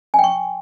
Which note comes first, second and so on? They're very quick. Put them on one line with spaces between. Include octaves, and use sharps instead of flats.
G#5 G5 C#6